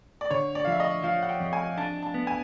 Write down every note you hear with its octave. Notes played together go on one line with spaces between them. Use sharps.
D5
D3 C#5
D5
F5
F3 E5
D#5
F3 F5
F#5
G5
F2
G#5
D4 A5
A5
B3
G#5